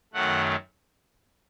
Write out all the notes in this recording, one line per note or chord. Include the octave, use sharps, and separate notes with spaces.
F#2 D#3 F#3 A3 F#5